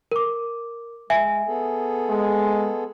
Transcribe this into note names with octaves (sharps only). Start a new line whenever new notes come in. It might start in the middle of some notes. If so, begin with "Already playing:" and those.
A#4 D6
G#3 E5 G#5
B3 G#4 A4
G#3